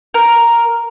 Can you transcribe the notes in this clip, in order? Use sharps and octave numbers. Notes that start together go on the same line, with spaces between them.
A#4